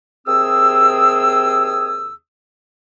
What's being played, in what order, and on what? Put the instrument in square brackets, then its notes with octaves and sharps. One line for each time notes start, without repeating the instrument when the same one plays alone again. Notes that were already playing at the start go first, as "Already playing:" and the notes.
[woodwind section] D#2 C3 C4 G#4 D#6 E6